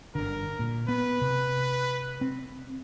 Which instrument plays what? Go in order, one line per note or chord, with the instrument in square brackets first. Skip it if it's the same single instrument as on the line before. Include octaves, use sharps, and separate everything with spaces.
[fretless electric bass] G1 D3 [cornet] A#4
[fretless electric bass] A#2
[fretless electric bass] B3 [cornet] B4
[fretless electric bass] C3
C4